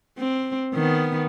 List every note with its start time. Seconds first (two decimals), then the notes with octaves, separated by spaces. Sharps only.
0.18 C4
0.74 D#3 B3